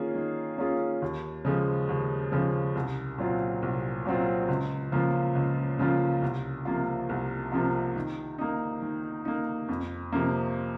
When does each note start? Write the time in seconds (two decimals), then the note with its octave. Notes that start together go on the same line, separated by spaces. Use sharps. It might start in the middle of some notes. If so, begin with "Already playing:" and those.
Already playing: D#3 A#3 C#4 F4 G#4
0.15 D#3
0.58 A#3 C#4 F4 G#4
1.02 D#2
1.45 C#3 F3 G#3
1.89 D#2
2.32 C#3 F3 G#3
2.75 C2
3.18 A#2 F#3 C4 F4
3.62 C2
4.05 A#2 F#3 C4 F4
4.48 C#2
4.92 C#3 F3 A#3 F4
5.35 C#2
5.79 C#3 F3 A#3 F4
6.22 C2
6.65 C3 F3 A#3 F4
7.09 C2
7.52 C3 F3 A#3 F4
7.96 D#3
8.38 A#3 D#4
8.82 D#3
9.25 A#3 D#4
9.69 F2
10.12 C3 F3 A#3